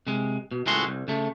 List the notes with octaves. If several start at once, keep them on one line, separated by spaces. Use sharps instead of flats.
C3 G#3
B2
C#2 A2 G#3 E4 F#4 C6
C2
C#3 A3